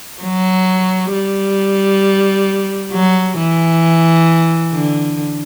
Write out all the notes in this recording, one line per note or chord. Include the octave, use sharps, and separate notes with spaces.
F#3
G3
F#3
E3
D3